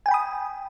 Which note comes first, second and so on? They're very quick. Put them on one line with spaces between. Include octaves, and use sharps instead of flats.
G#5 G5 B5 D#6